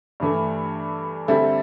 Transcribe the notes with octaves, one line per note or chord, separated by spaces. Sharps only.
G2 E3 A3
D3 G3 C4 E4 A4